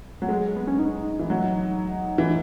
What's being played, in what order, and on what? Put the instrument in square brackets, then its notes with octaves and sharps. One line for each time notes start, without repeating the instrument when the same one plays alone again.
[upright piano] F#3
G#3
[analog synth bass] B3
C#4
D#4
[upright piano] E3
F#3
E3